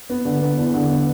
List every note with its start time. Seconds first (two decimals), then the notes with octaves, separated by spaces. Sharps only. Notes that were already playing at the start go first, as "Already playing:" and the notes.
0.10 B3
0.25 D3
0.42 B3
0.57 E2
0.74 D3
0.90 B3